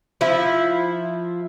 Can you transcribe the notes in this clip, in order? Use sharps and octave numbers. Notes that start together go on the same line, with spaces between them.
F3 E4